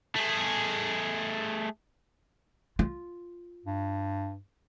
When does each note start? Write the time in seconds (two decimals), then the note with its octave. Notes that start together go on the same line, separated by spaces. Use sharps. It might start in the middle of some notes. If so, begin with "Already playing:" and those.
0.15 A3 G#4
2.79 F4
3.65 G2